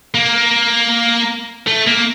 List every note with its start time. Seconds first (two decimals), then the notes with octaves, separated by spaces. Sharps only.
0.14 A#3
1.67 A3
1.87 A#3